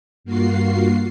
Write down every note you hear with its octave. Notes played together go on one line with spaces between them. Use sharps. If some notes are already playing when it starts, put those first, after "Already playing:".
G2 A#3 F4 F#4 C7